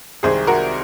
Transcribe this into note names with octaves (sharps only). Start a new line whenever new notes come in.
C2 C3 D#3 G#3 G#4 C5
F#4 A#4